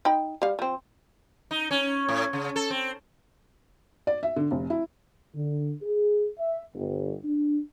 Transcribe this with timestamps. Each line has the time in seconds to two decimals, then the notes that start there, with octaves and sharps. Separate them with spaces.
0.05 D#4 G5 B5
0.42 G3 F5
0.59 F3 C4
1.51 D#4
1.71 C#4
2.09 A2
2.33 C#3
2.56 A4
2.70 C4
4.07 D5
4.23 E5
4.36 D3
4.51 F1
4.70 E4
5.35 D3
5.82 G#4
6.39 E5
6.75 G1
7.24 D4